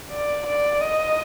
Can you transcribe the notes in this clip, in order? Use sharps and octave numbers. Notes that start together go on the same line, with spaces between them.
D5
D5
D#5